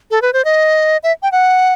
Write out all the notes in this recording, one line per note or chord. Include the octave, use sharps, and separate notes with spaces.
A4
B4
C5
D#5
E5
G5
F#5